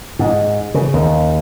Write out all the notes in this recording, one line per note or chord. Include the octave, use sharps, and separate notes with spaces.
G#2
C#3
D#2